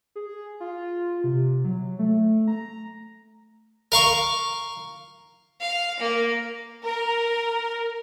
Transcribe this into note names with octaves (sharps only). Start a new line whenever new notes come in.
G#4
F4
C3
F#3
A3
A#5
A#4 F5 C#6
F5
A#3
A#4